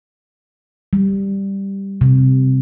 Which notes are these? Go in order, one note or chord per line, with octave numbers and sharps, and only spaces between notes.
G3
C3